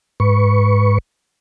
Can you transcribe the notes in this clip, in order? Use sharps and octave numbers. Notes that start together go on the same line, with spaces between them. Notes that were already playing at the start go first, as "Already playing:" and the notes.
G#2 B4 C#6